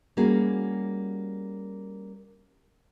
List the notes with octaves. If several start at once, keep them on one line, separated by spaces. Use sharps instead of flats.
G3 A#3 C#4 F#4 G#4